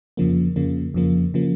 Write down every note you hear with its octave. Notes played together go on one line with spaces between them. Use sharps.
F2 C#3 F3 A#3
F2 C#3 F3 A#3
F2 C#3 F3 A#3
C#3 F3 A#3